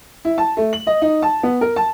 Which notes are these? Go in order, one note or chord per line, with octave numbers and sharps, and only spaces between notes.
E4
A5
A3
F#7
D#5
D#4
A5
B3
A#4
A5